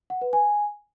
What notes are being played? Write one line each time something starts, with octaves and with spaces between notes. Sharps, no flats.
F#5
B4
G#5